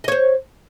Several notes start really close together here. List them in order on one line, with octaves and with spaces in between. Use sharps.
D#5 C#5 C5